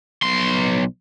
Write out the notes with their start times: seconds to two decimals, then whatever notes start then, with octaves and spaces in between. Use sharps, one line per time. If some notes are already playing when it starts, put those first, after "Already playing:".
0.22 B1 C6